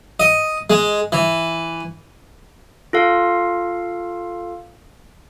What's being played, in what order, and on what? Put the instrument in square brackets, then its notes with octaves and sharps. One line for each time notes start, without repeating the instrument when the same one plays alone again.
[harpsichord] D#5
G#3
E3
[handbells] F4 A4 F5